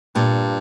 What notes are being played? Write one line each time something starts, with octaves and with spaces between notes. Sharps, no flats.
G2 A#2